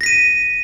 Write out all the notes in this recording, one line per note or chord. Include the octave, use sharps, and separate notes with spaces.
A#6 B6 D#7